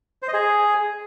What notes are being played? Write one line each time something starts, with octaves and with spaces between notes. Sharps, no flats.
C5
D#5
G#4